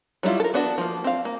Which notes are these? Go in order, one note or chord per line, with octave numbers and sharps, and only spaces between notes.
F#3 G3 C4 E4 F4
A4 A#4
B3 D4 F#4
F3 A#3
C4 F5
A#3